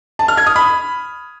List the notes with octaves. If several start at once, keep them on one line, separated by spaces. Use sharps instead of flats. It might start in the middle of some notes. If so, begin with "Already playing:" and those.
A5
F6
G#6
D#6
B5